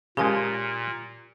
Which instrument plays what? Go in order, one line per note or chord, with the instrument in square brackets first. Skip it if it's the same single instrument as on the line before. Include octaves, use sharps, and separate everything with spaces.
[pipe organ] A#2 [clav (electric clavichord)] C#3 F3 G#3 [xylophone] G4 A#4 G#5